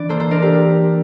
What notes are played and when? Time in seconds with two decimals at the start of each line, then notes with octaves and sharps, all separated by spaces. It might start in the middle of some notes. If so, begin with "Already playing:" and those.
Already playing: E3 D4 D5
0.09 A#3 A4 C5
0.20 A4 C5
0.31 D4 A#4 D5
0.42 G4 A#4